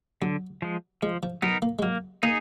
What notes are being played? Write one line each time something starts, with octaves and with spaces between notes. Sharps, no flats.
D3 F#3
F3 G#3
F3 G#3
F3
F#3 B3 D#4 A#4
A#3
G#3
F#3 A#3
A#3 D#4 G#4